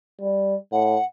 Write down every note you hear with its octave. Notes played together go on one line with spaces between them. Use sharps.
G3
A2 F#5